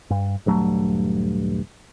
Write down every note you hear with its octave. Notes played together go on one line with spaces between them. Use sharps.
G2
D#1 G2 F#3 A3